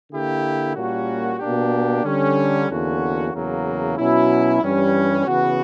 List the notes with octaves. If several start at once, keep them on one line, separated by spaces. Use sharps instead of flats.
D3 A#3 E4 G4
A#2 G3 A#3 C#4 F#4
B2 A#3 D4 G4
D3 G3 C#4
E2 D3 A#3 C#4 F#4
E2 C#3 F#3 A#3
B2 F#3 C#4 E4
G2 E3 G3 C#4
C#3 E3 B3 F#4